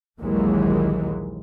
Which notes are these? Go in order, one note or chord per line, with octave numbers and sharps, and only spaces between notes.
A#1 D#2 D#3 E3 F#3 G#3